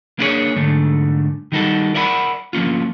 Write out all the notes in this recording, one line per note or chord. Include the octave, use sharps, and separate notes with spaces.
A#3 B3 D4 E4 G#4 C#5
G#2 D3 A3
D#3 G3 D#4 F#4 A4
A#4 D5 E5 F#5 A5 B5
F3 A#3 C#4 F4